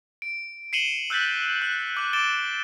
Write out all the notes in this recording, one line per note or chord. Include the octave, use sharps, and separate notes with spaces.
D7
C7 C#7 D#7 E7 F#7 G7
E6 F#6 G6 A6 B6
F#6
D6 F#6
D6 A6 D7 E7 G7